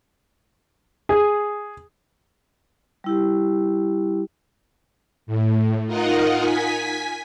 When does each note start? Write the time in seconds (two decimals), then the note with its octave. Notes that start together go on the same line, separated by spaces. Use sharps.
1.09 G#4
3.04 G3 E4 G4
5.26 A2
5.86 D#4 F4 A#4 D#5 F#5
6.40 G#5 B6